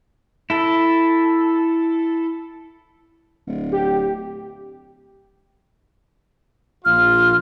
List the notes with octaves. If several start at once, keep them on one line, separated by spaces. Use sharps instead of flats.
E4 A4
D1
G4
A#1 F4 F6